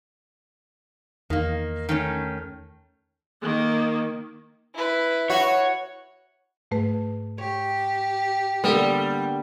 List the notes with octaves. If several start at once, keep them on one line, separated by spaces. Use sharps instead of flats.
E2 D#3 A#3
D#3 A3 C#4
D#3 A#3
E4 B4
F#4 C#5
G#2 A3 B4
G4 C#5
D3 G3 A#3 B3